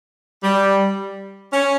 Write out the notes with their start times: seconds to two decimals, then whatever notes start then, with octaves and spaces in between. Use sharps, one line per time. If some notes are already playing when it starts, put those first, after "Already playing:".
0.43 G3
1.53 C#4